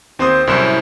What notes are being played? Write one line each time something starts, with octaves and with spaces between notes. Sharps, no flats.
D#2 C4 C5 C6 D#6
C2 F#2 A2 E4 C5 E7